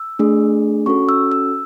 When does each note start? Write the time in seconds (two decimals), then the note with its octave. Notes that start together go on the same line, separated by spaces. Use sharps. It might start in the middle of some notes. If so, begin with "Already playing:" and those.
Already playing: E6
0.19 A3 D4 G#4
0.86 C#4 F#4 A4 C#6
1.09 E6
1.32 E6